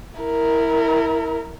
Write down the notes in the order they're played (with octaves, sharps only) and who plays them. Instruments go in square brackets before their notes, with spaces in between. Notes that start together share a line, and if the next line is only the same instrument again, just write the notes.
[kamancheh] E4 A#4